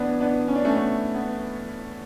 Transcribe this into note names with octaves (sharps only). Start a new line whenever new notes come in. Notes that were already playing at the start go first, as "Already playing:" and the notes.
Already playing: A2 E3 B3 D4
B3 D4
C#4
D4
A3 C#4
B3
B3